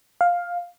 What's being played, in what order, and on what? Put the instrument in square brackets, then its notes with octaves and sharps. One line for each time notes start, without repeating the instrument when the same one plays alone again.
[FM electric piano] F5